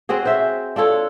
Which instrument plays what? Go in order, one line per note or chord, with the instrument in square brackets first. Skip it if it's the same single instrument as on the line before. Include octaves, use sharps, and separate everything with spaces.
[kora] C4 C#4 F#4 G#4
C5 E5
D4 F4 A4 C#5